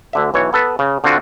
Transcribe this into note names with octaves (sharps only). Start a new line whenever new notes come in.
D2 D3 E5
B1 E3 C#5
B3 A4 B4
C#3
D3 C4 F4 F#4